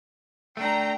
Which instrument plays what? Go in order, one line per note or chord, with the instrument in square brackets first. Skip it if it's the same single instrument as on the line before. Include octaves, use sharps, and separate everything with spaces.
[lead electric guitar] A3 D4 [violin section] G5 A#5